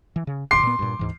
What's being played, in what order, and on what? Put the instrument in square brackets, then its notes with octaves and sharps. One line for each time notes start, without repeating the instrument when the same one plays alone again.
[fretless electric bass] E3
C#3
[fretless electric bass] D1 A1 D2 [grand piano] C6 D6 C7
[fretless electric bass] A#2 B3
G2 A#2
D2 G#2 E3